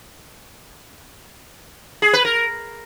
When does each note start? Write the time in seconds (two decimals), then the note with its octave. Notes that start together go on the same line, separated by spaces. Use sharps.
2.02 G#4
2.13 B4
2.25 A#4